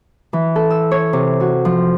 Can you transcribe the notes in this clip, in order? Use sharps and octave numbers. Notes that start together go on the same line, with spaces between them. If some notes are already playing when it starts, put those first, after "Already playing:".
E3
A4
E6
C#5
C3
F#4
F3